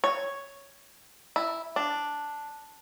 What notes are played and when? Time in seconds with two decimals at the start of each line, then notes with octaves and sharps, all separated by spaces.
0.04 C#5
1.36 E4
1.76 D4